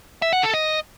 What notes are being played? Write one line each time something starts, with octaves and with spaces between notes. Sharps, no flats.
E5
F#5
A4
D#5